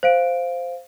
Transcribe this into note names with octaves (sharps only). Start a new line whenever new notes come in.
C5 F5 D7